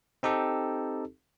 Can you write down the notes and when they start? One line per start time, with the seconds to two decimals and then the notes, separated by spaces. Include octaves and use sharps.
0.23 C4 D#4 G4 A4